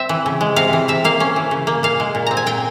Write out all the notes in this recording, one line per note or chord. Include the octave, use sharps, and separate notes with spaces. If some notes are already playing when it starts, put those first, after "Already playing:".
Already playing: C4 E5
E3
C#3
G#3
C3 F5
E3
C3 E5
A#3 F5
C#4
E3
C#3
A#3
A#2 F5
G#3
A#2
C4 A#5
G#5
A#2 G5